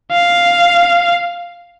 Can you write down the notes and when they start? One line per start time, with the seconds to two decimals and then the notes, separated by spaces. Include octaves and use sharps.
0.11 F5